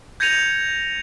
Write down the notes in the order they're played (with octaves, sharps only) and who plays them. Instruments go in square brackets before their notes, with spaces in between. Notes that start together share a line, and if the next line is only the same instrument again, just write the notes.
[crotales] G6 G#6 A#6 C#7 D#7 F7